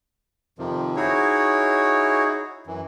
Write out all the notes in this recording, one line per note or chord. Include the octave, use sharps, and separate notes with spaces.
F2 C3 D#3 F3
D#4 E4 F#4 G#4 C#5
F#2 E3